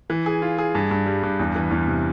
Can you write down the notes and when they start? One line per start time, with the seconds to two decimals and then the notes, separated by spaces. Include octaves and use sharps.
0.10 E3
0.26 G#4
0.42 F4
0.58 G#4
0.75 G2
0.91 G2
1.06 G3
1.23 G2
1.39 E2
1.55 E3
1.71 E2
1.88 C3